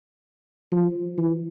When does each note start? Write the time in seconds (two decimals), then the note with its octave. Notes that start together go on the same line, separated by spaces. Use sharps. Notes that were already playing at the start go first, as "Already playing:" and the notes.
0.72 F3
1.18 E3